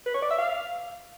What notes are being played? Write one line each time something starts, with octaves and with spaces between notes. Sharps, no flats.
B4
C#5
D5
E5
F5